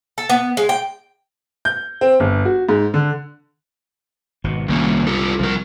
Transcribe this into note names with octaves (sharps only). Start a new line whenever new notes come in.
A4
B3
G#3
G5
G6
C4
G1
F#4
G#2
D3
G#1 B2
C2 D#3 A#3 C#4
F4 G4 A4
C2 F3 A#4